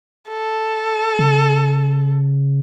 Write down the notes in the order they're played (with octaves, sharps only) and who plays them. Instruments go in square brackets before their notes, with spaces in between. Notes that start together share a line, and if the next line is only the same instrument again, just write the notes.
[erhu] A4
[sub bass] C#3